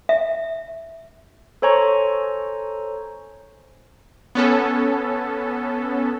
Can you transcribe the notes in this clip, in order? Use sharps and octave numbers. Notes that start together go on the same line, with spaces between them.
E5
A4 C5 C#5 G#5 A#5 C#6
B3 C#4 A4